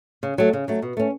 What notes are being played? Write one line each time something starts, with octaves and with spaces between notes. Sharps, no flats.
C#3
F#3 A3
C#3
F#3 A3
B2
A3 C#4